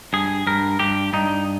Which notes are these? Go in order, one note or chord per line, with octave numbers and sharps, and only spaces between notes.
G2 G#4
G2 A#4
G2 G4
G2 D#4